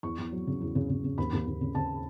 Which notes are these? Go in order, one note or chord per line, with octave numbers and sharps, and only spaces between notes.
E2 C#6
E2
F#3
C#3
E2
C#3
C#3
C#3
D#2 B5
D#2
D#2
C#3
C#3 A5